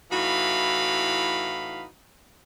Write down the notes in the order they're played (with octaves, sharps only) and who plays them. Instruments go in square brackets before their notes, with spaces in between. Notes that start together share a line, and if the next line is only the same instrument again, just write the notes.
[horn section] A2 E3 D#4 F#4 F5 B5